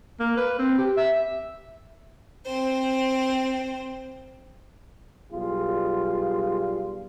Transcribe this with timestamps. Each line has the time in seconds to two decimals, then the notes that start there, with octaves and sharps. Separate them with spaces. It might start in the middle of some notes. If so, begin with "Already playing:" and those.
0.20 A#3
0.37 B4
0.59 C4
0.78 G4
0.97 E5
2.45 C4 C5
5.32 B1 G3 F4 G#4